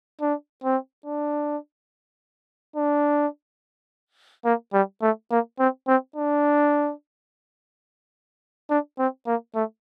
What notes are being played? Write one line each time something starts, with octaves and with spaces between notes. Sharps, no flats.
D4
C4
D4
D4
A#3
G3
A3
A#3
C4
C4
D4
D4
C4
A#3
A3